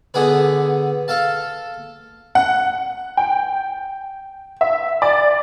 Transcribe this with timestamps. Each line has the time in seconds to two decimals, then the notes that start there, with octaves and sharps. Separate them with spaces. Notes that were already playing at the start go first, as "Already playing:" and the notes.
0.14 D3 B3 G#4 B4
1.08 A4 F5 A5
2.35 F#5
3.17 G5
4.61 E5
5.02 D5